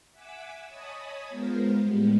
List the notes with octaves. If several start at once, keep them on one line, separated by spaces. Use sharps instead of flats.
E5 F#5 G#5 D6 E6
C#5 D#5 G#5 A5 B5 D#6
G#3 B3 F4 A#4 C5
A2 G3 G#3 B3